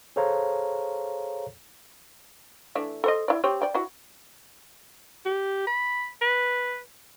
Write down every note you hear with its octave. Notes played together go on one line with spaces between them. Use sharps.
G#4 A4 C5 C#5 F5 A#5
E3 A3 D4
A4 C5 D#5
E4 D5
C4 G4 C#5
D5 G5
E4 F#4
G4
B5
B4